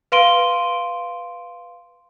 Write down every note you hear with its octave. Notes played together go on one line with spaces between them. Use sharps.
B4 F5 C6 D7 D#7 G7